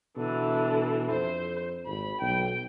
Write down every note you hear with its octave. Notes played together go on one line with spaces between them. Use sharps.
B2 D3 E3
F2 C5
G#1 B5
B1 G5